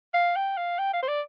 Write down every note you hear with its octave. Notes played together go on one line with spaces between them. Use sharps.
F5
G5
F5
G5
F5
C5
D5